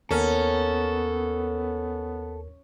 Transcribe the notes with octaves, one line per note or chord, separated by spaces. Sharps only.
D#2 B3 C#4 A4 A#4